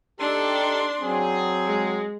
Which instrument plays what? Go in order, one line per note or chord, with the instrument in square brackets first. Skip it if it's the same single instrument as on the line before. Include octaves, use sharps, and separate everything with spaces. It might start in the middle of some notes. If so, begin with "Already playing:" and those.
[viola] D4 C6 [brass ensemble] D#4 G4 A4
[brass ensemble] F#3 C4 G#4
[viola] G#3